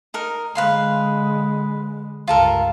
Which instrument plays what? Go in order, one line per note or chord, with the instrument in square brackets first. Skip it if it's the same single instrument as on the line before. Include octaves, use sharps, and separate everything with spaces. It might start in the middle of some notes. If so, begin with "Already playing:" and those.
[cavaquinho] D#4 A#4
[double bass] D3 G#3 [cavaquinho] B4 F5 C6
[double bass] C#2 G2 [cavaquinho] F4 A4 A#4